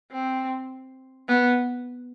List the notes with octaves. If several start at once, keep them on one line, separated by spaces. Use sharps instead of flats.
C4
B3